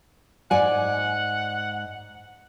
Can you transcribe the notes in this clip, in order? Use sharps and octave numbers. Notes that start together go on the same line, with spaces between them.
G#2 D5 F#5 G#5